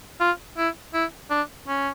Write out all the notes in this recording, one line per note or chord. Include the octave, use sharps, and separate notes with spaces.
F4
E4
E4
D4
C#4